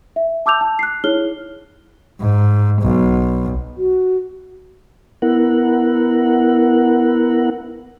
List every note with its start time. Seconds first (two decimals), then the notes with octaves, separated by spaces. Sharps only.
0.16 E5
0.46 A5 D6 E6 G6 F7
0.61 A5
0.79 F#6 C7
1.04 D#4 E4 G#4 C#5 F6 G7
2.20 G#2
2.81 B1
3.78 F#4
5.22 B3 E4 A#4 F#5